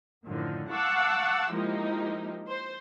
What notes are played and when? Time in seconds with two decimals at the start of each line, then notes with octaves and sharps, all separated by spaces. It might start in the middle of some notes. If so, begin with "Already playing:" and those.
0.24 F#2 A2 D3 D#3 F3
0.70 F5 F#5 A5 C#6 D6 E6
1.52 F3 G#3 A#3 D#4 E4 G4
2.47 C5